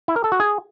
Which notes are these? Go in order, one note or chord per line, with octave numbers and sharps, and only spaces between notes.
E4
A#4
A4
F#4
G#4